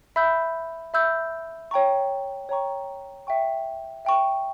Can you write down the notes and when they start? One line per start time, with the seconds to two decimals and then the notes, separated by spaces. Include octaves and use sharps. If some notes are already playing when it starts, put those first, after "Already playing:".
0.16 E5 B5 E6 G6
0.94 E5 B5 E6 G6
1.71 C#5 G5 A#5 C#6
2.49 C#5 G5 A#5 C#6
3.27 E5 G5 C#6
4.05 E5 G5 C#6